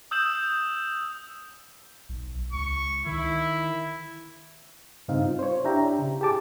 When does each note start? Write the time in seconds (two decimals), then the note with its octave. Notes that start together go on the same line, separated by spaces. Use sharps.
0.11 D#6 E6 G6 E7 F#7
2.09 B1
2.53 C#2 C#6
3.06 D#3 E4
5.08 G2 C#3 C4 D#4 F5
5.25 F4
5.39 C5 C#5
5.65 D4 E4 G4 E5 G5 A#5
5.99 C#3
6.21 G4 G#4 A5 D6